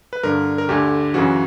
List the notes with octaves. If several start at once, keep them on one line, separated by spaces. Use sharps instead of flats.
B4
G2 D3 A#4
A#4
D2 D3 G4
F#2 C#3 E3 F#4